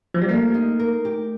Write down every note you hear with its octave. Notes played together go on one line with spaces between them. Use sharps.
F3
G3
A3 A#3
D#4
A#4
G4